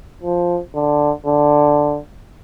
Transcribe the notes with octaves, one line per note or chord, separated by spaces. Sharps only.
F3
D3
D3